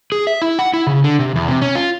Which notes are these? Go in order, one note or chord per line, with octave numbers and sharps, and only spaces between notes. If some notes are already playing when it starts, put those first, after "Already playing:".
G#4
E5
E4
F#5
E4
C#3
D3
C3
E2
C3
C#4
F4